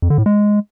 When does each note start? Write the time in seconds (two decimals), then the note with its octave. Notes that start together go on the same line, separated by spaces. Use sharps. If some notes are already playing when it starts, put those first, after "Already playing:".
0.02 F2
0.10 D3
0.18 A2
0.26 G#3